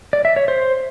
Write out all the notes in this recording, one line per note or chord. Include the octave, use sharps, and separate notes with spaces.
D5
E5
C#5
C5